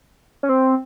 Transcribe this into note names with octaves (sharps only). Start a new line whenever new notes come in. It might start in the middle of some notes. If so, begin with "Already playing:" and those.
C#4
C4